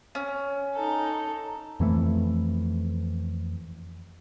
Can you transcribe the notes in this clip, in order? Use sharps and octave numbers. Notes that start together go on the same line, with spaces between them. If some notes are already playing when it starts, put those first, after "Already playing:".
C#4
D#4 A4
F2 E3 A3